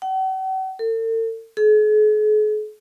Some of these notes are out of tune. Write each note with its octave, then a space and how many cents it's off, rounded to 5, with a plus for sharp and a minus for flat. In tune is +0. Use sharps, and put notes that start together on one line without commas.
F#5 +45
A4 +45
G#4 +45